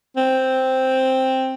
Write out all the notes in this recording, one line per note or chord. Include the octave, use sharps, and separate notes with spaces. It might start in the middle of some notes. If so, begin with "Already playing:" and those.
C4